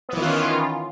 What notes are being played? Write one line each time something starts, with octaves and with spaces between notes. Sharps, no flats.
D#3 E3 B3 C#4 F4